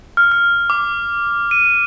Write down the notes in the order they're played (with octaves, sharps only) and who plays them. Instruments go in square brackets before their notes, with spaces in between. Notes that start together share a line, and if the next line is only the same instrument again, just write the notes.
[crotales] F6
F6
D6
D#7